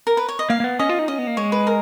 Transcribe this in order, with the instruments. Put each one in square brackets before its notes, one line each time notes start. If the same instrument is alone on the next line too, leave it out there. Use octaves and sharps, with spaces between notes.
[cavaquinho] A#4
B4
C#5
D#5
[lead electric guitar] A#3 [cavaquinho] F5
[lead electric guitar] A#3
B3
[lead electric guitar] C#4 [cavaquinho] D#5
[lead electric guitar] F4
D#4
[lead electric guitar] C#4 [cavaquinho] D#5
[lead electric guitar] B3
A#3
[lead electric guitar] G#3 [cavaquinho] C#5
[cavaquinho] B4
A#4